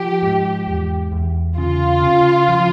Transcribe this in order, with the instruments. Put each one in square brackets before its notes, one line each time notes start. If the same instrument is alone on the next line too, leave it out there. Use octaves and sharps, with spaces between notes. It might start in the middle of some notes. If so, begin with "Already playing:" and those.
Already playing: [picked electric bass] F3 [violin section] G4
[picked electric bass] G#2
E2
E2
[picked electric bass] C#3 [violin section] F4
[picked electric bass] C#3
F3